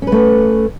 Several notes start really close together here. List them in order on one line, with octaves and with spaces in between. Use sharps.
C#4 B4 A3